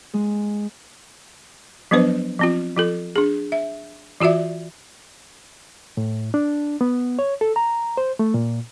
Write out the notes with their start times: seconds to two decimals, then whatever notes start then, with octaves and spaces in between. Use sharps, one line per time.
0.14 G#3
1.91 F3 F#3 B3 D4 B4 C5
2.39 F3 C4 F4
2.76 F3 F4 A4
3.16 D4 G#4
3.52 E5
4.20 E3 F4 F#4 D5 E5
5.97 A2
6.34 D4
6.81 B3
7.19 C#5
7.41 A4
7.56 A#5
7.97 C5
8.19 A3
8.34 A#2